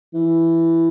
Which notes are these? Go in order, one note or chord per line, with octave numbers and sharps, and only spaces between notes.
E3